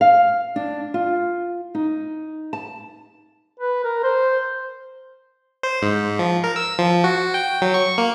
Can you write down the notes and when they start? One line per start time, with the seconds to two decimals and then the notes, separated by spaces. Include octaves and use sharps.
0.01 F5
0.56 D4
0.94 F4
1.75 D#4
2.53 A5
3.59 B4
3.84 A#4
4.03 C5
5.63 C5
5.82 G#2
6.19 F3
6.44 A#4
6.56 E6
6.79 F3
7.04 F#4
7.34 G5
7.62 F#3
7.74 C#6
7.98 A#3